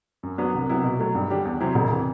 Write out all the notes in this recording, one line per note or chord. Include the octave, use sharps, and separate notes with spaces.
F#2
F#3 B3 D4 F#4
C2
C3 F#3 B3 E4
B2
F#3 A3
G2
D3 G3 D4 G4
E2
C3 F#3 C4 E4
E1
C3 E3